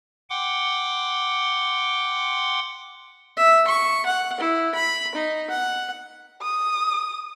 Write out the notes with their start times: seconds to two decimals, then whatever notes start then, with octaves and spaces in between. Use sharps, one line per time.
0.30 F#5 G5 C6 D6
3.37 E5
3.67 C#6
4.05 F#5
4.40 E4
4.74 B5
5.15 D#4
5.50 F#5
6.42 D#6